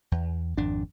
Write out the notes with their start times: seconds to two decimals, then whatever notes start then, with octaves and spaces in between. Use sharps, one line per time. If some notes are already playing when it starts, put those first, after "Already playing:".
0.12 E2
0.57 G#1 F2 D4